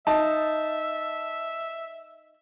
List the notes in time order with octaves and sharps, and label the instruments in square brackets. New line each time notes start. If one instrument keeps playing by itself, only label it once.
[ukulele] D#4 [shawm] E5 [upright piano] A5